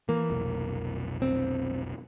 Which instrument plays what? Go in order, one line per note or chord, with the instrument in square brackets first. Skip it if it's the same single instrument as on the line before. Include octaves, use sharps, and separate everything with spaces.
[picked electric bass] E3 [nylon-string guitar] A#3
[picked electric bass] F1 B1
[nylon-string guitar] C4